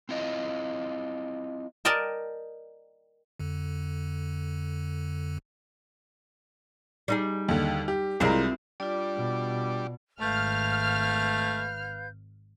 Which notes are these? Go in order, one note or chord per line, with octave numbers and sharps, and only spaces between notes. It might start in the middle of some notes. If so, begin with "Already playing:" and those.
C4 E4 F4 D#5
A#4 D5 D#5 G5 A5
F2 D3
G3 D#4 G#4
D#2 D3
G4
C2 G#3 C4 E4 F4 A#4
G3 D4 F4 D5
B2
G#1 A3 B4 F5 F6 G6